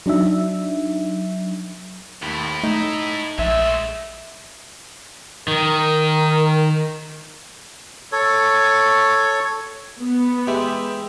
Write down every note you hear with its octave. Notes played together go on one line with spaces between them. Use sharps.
F#3 D4 D#4 E5
D#2 A2 E4
A3 D#4
A#1 G#3 A3 E5
D#3 A#4
A4 C#5
B3
E3 G#3 G4 E5